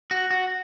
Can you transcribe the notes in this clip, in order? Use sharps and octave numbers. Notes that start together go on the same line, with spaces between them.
F#4
F#4